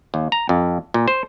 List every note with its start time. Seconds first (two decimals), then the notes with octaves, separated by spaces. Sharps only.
0.14 D#2
0.32 A#5
0.49 F2
0.94 A#2
1.08 C5